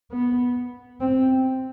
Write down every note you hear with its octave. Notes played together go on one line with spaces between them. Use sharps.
B3
C4